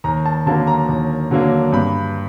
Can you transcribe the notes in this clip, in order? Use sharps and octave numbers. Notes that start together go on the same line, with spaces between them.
D#2 A#5
A5
D3 F#3 A#3 A5
A#5
D#2
D3 F#3 A#3
G2 B5